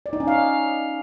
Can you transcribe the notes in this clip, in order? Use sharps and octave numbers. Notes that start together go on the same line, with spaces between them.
D5
D#4
C#4
F5